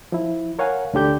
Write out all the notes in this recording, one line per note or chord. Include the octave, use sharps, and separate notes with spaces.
F3 E4
A#4 C#5 F5 F#5 G#5
D2 D3 G4 G6